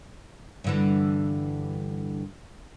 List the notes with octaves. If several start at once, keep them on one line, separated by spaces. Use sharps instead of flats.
G2 D3 E3